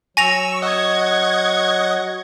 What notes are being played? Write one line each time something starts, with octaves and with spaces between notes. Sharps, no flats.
F#3 G#5 C#6 E6 A#6 F7
D#5 F#5 C#6 G#6